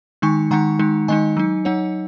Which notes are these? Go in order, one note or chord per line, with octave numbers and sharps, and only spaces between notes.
D#3 G#3 D#4 G#5 C#6
D#3 G#3 D#4 F#5 A#5
D#3 G#3 D#4
D#3 G#3 D#4 D#5 G#5
F#3 D#4
F#3 D#4 C#5 F#5